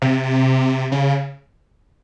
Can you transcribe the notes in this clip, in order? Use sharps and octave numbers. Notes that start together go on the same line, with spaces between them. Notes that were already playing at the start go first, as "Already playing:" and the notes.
C3
C#3